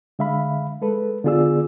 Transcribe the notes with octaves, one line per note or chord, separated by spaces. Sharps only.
D3 G#3 E5 F5 B5
G#3 A4 B4
D3 B3 F4 G#4 D5 E6